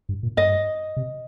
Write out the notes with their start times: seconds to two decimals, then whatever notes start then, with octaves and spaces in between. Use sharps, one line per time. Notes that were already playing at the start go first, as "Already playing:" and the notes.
0.09 G2
0.23 A#2
0.37 G2 D#5
0.97 C3